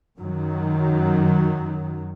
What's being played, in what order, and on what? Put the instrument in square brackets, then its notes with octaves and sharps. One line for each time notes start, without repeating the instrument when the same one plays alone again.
[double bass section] F#2 D#3 F#3